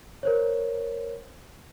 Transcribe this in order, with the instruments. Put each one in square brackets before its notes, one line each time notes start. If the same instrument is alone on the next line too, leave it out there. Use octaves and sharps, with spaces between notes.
[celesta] A#4 C5 C#5